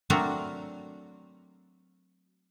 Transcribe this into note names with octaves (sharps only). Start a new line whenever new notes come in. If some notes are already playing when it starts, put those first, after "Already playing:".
F#3 A3 C4 D4 F#4 A#4